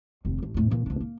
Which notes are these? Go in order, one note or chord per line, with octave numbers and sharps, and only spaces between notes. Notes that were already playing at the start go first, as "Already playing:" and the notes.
F1 D#2
A1
E2 A2
A#2 E3
D2 D4
A#3